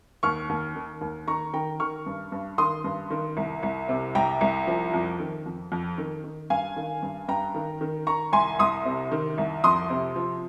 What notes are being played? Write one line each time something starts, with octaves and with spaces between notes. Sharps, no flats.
D#2 C#6 F6
D#2
D#3
D#2
D#3 A#5 C#6
D#3 G5 A#5
D#3 C#6 F6
G2
G2
D#3 C6 D#6
G2
D#3
C2
C2
C3
C2 G5 A#5
C2
F3
F2
D#3
F2
F2
D#3
D#3
G2 F5 G#5
D#3
G2
G2 G5 A#5
D#3
D#3
D#3 A#5 C#6
C2 G#5 C6
C2 C6 D#6
C3
D#3
C2
F2 C6 D#6
C3
F3